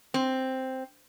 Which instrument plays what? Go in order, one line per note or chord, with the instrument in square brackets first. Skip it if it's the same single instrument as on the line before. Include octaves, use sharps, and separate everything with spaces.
[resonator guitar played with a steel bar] C4